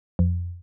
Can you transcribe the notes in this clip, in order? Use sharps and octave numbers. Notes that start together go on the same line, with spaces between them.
F2